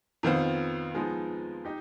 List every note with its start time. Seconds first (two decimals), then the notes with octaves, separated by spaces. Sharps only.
0.23 F2 D#3 B3 F4 C5
0.95 F3 G#3 B3 D#4
1.65 D#4 G4